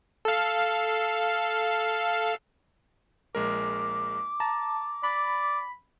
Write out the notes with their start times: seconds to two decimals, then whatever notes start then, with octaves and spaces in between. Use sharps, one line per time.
0.25 A4 F5
3.35 A#1 G#3 A#4 D6
4.40 A5 A#5
5.03 D5 B5